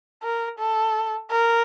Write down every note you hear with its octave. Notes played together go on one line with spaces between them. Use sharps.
A#4
A4
A#4